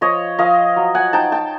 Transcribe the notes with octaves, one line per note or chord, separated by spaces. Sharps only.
F3 C#5 D#5
F3 D#5 F5
F#3
F#5 G#5
D#4 G5 A5
G5 A5